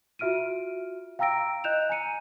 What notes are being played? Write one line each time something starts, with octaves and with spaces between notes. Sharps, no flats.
F4 F#4 E5 F6 D7 D#7
F5 G5 A#5 E6 A#6 D7
D#5 F#6 G6 E7 F7
G#5 A#5 C#7 D#7